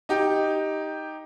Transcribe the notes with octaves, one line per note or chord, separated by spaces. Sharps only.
D#4 G4